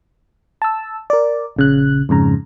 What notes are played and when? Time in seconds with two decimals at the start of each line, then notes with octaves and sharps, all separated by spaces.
0.62 A5 E6
1.10 A#4 D5
1.56 A#1 C#3 F#6
2.09 F2 G#2 C#3 A#5